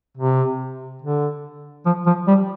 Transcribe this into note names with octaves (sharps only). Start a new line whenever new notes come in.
C3
D3
F3
F3
G3